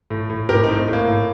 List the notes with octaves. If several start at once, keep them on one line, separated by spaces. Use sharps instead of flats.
A2
A2
A2 G4 A#4
C4 D#4
A2
A2
A#3
A2